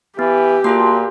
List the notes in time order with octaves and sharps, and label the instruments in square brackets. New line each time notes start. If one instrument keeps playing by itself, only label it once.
[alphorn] E3 [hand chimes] B3 [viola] G4
[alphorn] A#2 [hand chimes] A#3 F4 G#4 [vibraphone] F#4 A5 C6